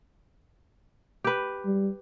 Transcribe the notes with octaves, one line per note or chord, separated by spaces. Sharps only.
G4 B4
G3